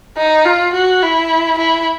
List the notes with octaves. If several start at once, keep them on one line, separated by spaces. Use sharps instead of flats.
D#4
F4
F#4
E4
E4